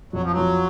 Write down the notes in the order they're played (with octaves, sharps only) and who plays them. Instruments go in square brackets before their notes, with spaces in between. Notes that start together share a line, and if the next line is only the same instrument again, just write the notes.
[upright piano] F2 [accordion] F#3
[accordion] F3
F#3
[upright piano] F3